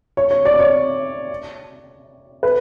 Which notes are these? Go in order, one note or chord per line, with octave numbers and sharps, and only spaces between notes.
C#5
C#5
D5
C#5
B4